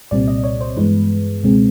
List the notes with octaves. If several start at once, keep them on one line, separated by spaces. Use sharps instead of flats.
C2 A#2 G3 C4 D5
D#5
C#5
C5
G2 E3 G#3 B3 B4
C#2 B2 G#3 C4